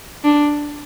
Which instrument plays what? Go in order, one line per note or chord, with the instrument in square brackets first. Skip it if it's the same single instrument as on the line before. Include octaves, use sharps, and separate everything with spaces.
[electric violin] D4